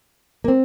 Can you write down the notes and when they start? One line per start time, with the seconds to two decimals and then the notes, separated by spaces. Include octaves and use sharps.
0.44 A#3
0.48 C4